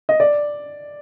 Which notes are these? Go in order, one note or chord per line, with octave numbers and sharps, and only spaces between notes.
D#5
D5